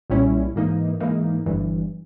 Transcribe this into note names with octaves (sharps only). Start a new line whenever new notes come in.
B1 A#2 G3 C#4 E4
G#2 E3 A#3 D#4
G#2 E3 A#3 D#4
G1 G2 E3